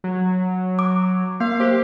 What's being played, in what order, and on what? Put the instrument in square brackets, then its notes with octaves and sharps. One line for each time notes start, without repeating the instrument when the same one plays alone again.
[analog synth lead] F#3
[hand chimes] D6
[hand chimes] A#3 [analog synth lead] F5
[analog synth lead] G4 [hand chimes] C5